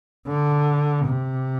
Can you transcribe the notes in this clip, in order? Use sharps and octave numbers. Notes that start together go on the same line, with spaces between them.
D3
C3